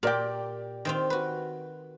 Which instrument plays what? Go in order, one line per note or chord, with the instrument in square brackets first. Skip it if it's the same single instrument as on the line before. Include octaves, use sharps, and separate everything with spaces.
[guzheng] A#2 G4 [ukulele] A#4 D5 G5
[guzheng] D#3 C4 F4
F#4 B4